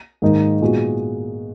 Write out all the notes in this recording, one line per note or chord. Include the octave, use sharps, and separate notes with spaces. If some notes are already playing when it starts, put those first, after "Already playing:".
G#2 D#3 A#3 D#4
A#2 G#3 B3 F#4